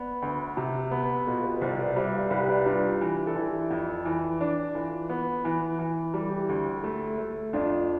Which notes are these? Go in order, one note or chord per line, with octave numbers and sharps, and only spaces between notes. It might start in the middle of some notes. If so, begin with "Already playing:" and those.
Already playing: B3 B4 D5
D2
C3
B3
B2 F4 A4
G4 B4
B4
C2 A4 C5
B4 D5
G3 C5 E5
D5 F5
C2 G4 B4
B4 D5
G3 D4 F4
E3
A4
E3 E4 G4
F2
E3
D4
E3 F4 A4
B3
E3
E3
G3 G4
A4
E4 G4
D2
A3
A3
F2 D4 F4